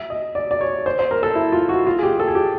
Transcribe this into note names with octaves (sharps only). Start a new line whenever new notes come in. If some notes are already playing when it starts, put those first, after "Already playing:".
Already playing: E5
D#5
D5
D5
C#5
C5
C5
A#4
A4
E4
F4
F#4
F4
G#4
G4
A4
G#4
G4